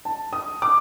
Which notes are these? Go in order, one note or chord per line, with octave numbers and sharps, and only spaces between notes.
A5
D#6
D6